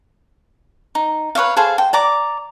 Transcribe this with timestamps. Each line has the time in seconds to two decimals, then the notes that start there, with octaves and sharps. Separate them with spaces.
0.95 D#4
1.35 B4 C#5 E5 F5
1.57 G#4 A4 C5 F5
1.78 G5
1.93 D5 A#5 D6